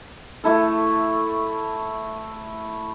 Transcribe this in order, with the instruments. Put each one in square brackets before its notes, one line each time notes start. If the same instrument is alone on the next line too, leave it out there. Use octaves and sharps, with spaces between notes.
[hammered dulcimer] A3 E4 A4